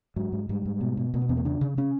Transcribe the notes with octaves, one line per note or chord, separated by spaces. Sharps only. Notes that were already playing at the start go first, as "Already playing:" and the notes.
G#2 F#3
G#2
G#2 G3
G#2
B2
B2
B2 A#3
B3
E2 C4
A#3
C#3 D4
C#3
C#3 C#4